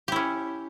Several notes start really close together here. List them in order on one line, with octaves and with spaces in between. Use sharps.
G4 E4 C#4